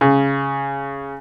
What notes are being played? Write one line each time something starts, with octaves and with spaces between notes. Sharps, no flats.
C#3